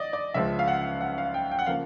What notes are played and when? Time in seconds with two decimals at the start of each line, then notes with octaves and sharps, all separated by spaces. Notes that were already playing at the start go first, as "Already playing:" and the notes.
Already playing: D5 D#5
0.13 D5
0.34 C#2 C#3 F3 G#3 E5
0.59 F5
0.68 F#5
1.01 F#5
1.18 F5
1.34 G5
1.51 G5
1.59 F#5
1.66 C#3 F3 A#3 F5